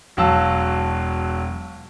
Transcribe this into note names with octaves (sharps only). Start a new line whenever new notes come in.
E1 F#3 F5 A5 E6